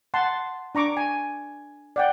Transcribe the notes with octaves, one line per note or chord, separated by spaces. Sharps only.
F#5 A5 C6
D4 A#5 C#6 D6
G#5
D5 F#5 G5